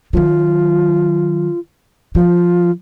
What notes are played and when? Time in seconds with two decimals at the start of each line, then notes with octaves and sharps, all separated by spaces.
0.13 D#3 F#3 F4
2.15 F3 F4